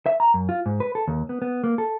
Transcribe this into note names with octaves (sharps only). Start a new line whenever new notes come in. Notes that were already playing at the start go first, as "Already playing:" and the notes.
E5
A#5
F#2
F4
G#2
B4
A4
D#2
B3
B3
A#3
A4